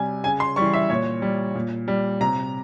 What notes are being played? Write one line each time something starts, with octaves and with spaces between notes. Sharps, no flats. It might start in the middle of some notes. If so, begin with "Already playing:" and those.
Already playing: C3 G3 G#5
C#3 G#5
C6
E3 G3 C#6
E5
A#2 C#5
G3
A#2
G3
C3 A#5